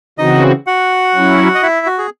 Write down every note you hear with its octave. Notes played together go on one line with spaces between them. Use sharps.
C#3 E3 C4 D#4 F#4 D#5
F#4 F#5
F#3 C#4 E4
D#5
E4 E5
F#4
G#4